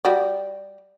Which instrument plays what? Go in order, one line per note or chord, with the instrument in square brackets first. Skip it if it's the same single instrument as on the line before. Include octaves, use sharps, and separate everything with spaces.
[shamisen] G3 F#4 D5